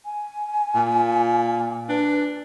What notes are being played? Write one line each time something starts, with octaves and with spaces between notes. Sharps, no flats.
G#5
A#2
D4 B4